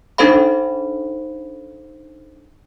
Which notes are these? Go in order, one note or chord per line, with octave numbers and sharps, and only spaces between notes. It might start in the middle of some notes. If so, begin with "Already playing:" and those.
D4 D#4 A4 C5 F5 B5